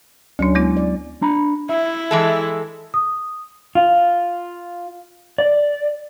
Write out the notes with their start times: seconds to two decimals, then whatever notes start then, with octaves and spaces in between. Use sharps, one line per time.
0.39 D2 F#3 C#4 D4
0.55 G#3 B3 E4
0.77 D5
1.22 D4 A#5 B5
1.69 E4 E5
2.11 E3 G#3 A4
2.94 D#6
3.75 F4
5.38 D5